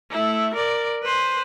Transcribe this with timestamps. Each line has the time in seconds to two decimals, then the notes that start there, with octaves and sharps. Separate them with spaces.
0.11 A3 E4
0.54 A#4 D5
1.04 B4 C5